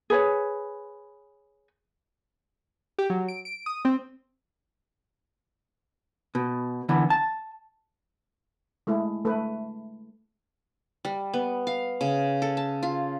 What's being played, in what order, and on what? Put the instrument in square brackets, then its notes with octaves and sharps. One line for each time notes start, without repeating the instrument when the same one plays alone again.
[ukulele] G#4 B4 C#5
[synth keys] G4
F#3
D7
D7
D#6
C4
[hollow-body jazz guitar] B2
D3 E3 B3
A5
[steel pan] G#3 A3 E4
A3 B4
[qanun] G3
B3
F5
C#3
A4
A5
F4